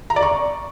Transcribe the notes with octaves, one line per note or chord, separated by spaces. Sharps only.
A#5
D5
C#6